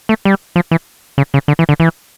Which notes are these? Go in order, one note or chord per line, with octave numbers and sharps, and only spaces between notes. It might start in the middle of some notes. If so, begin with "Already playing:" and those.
A3
G3
F3
E3
C#3
C#3
D3
E3
D3
E3